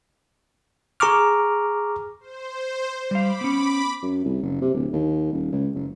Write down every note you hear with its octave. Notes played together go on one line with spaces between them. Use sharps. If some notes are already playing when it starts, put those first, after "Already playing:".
G#4 A#5 C#6 D6 F6
C5
G3 F5 B5 D6
B3 C#4
F#2
C2
F#1
C3
D1
D#2
D#1
C#2
F#1